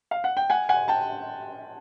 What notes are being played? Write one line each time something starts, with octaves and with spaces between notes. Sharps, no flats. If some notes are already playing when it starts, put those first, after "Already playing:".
F5
F#5
G5
F#5 G#5
F#5 G#5
G5 A5